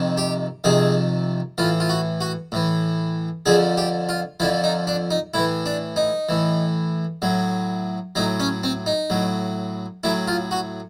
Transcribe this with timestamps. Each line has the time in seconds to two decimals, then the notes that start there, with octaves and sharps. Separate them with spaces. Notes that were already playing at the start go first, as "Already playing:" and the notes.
Already playing: F2 C3 D#3
0.17 G4
0.64 F2 C3 D#3 G#4
1.58 A2 E3 F4
1.80 F4
1.89 F#4
2.21 F#4
2.52 A2 E3
3.46 F2 D3 F3 G#4
3.77 G4
4.09 F4
4.40 F2 D3 F3 E4
4.64 D#4
4.87 D4
5.11 D#4
5.34 A2 E3 E4
5.66 D4
5.96 D#4
6.29 A2 E3
7.22 A2 F#3
8.15 A2 F#3 D#4
8.40 C#4
8.64 C4
8.86 D#4
9.10 A2 F#3
10.04 A2 F#3 E4
10.28 F4
10.51 F#4